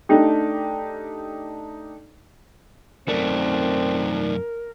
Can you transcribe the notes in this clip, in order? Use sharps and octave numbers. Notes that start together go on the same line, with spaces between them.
A3 D4 D#4 G4
F#2 A3 C4 D#4 A#4 D5